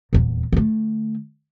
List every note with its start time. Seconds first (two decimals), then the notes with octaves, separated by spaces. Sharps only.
0.13 D#1 E2
0.52 D3 A3